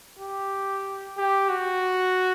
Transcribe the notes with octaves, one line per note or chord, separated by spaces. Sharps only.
G4
G4
F#4